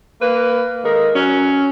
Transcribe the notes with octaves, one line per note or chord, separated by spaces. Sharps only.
A#3 B4
D#3 G#3 A4 A#4
F#3 C#4